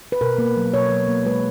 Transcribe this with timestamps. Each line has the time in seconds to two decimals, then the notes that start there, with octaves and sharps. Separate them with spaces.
0.12 B4
0.21 B2 A#4
0.38 A#3
0.56 F#3
0.74 B2 C#5
0.91 F#3
1.08 A#3
1.25 G#3 B4